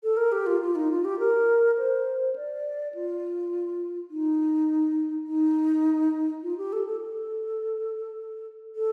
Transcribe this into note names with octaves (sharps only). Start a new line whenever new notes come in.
A4
A#4
G4
F4
F4
D#4
F4
G4
A#4
C5
D5
F4
D#4
D#4
F4
G4
A4
A4
A4
A4